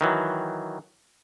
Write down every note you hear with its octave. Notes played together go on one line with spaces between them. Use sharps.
D#3 E3 F#3